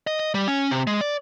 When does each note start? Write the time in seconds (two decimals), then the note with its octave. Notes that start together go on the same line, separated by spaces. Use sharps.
0.07 D#5
0.19 D#5
0.35 G3
0.48 C#4
0.71 C3
0.87 G#3
1.01 D5